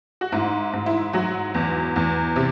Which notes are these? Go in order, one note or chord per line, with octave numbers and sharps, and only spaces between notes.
F#4
G#2 E4
G#2
E4
F#3 F#4
E2
E2
C3